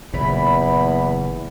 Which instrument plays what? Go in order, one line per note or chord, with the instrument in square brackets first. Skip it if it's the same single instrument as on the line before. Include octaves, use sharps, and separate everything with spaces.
[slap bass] F#1 A#2 E3 [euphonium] E2 [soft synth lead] B5